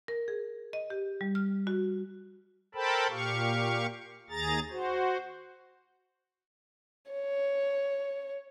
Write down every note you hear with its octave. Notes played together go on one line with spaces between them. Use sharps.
A#4
G#4
D#5
G4
G3
F6
F#4
A4 A#4 C5 G5 A5 B5
A#2 G4 F5 C#6
D#2 G#4 A#5 A6
F#4 C5
C#5